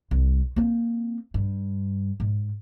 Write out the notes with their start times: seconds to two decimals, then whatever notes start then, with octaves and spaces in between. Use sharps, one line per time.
0.11 C2
0.56 A#3 C4
1.34 G2
2.20 G#2